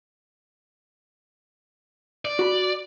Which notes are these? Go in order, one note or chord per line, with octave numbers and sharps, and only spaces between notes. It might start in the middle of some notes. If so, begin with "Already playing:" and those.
D5
F#4 B5